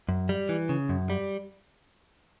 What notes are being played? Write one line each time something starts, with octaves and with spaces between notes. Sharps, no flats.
F#2
G3
E3
C#3
F#2
G3